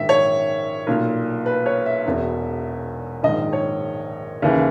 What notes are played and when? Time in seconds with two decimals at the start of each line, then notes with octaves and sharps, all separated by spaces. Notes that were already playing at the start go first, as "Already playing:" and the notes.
Already playing: A#1 G#2 D#3 E5
0.09 C#5
0.87 B1 A#2
1.46 B4
1.66 C#5
1.86 E5
2.06 E1 E2 B2
3.23 A#1 G#2 D#3 D#5
3.53 C#5
4.42 D#2 C#3 E3